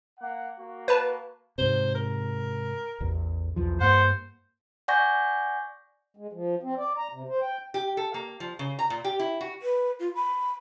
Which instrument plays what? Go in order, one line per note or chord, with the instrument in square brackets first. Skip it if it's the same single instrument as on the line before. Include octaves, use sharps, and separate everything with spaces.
[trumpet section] A#3 F#5
A#3 F#4
[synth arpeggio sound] B4 A5
[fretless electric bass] G#2 C3 [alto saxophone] C5
[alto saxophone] A#4
[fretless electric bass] A1 E2
B1 E2 F3
[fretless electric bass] G2 A#3 [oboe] C5 [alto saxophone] F#5
[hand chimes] D5 F#5 G#5 C#6 G6 A#6
[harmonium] G#3
F3
C4
D5
A#5
C3
C5
G5
[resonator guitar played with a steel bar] G4
A4
A#3
F3
C#3
A#5
A#2
G4
E4
F#4
[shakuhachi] B4
F4
B5